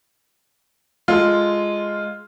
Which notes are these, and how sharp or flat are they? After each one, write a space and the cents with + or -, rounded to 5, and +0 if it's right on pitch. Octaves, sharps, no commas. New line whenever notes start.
G#3 +0 F4 +0 A4 +0